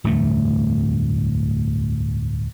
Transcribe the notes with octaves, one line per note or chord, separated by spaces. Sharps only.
D1 E2 G2 A3